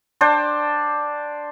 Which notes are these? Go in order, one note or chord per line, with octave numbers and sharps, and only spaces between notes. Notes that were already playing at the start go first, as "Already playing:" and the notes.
D4 C5 D5 G5